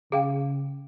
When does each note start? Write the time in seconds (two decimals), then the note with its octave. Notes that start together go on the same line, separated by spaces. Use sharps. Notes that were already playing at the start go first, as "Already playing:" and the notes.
0.12 C#3 G#4 F5 G5